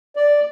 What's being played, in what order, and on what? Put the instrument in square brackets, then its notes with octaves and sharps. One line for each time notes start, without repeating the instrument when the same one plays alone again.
[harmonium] D5